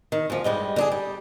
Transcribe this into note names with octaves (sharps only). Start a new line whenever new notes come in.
D#3
D2 F3
G2 G3 G#3 D#5
D3 D4 G#4
G3